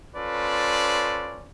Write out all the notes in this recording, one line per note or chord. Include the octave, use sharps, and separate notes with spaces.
C#4 F4 A4 B4 C5 D5